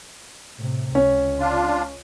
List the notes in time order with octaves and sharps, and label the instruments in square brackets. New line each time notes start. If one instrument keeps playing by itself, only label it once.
[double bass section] A2 C3
[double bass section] C#2 [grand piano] C#4
[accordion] D4 F4